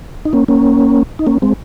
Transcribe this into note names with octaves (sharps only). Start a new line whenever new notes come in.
D#4
A#3 C#4
A#3 C#4
D#4
A#3 C#4
G#3 C4